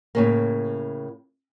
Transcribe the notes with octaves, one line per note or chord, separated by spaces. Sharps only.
A2 C#3 A#3